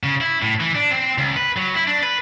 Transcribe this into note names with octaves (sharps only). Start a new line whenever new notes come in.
C#3
E4
A2
E3
D4
C4
C#2
B4
F#3
E4
D4
B4